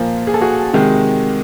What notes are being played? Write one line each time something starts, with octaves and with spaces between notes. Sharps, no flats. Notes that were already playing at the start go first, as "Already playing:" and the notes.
Already playing: A#2 F3 A#3 F4
G#4
A4
F#4 G#4
C3 D#3 G#3